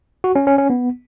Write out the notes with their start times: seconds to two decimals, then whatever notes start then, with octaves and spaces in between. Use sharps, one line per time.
0.24 F#4
0.35 C#4
0.47 C#4
0.58 C#4
0.70 B3